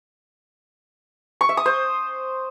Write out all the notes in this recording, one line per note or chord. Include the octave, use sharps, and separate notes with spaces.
C#6
E5
D#6
C5